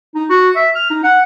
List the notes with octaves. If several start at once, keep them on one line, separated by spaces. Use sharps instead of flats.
D#4
F#4
E5
F6
D#4
F#5